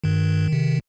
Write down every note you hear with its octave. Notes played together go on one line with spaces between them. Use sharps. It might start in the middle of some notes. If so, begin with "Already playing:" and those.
G2 D#3
C3 D#3